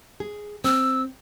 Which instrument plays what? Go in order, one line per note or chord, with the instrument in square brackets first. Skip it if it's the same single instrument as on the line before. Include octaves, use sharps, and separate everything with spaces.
[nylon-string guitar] G#4
[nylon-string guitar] C4 [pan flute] E6